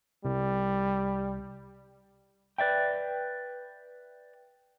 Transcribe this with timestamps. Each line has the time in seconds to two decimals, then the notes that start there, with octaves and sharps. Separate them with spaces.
0.25 C2 G3
2.58 B4 D5 E5 G5